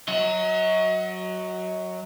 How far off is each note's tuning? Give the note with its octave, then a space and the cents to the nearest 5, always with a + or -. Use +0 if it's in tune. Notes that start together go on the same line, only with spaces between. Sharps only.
F#3 +0 D#5 +40